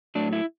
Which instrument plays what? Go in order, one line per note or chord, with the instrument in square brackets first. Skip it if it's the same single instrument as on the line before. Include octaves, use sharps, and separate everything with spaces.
[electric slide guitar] A2 F#3 A3 D4
E4